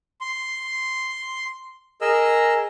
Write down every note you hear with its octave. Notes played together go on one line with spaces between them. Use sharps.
C6
G#4 A#4 D#5 E6